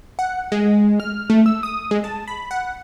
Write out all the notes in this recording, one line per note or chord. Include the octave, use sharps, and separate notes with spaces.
F#5
G#3
F6
A3
E6
D#6
G#3
A5
B5
F#5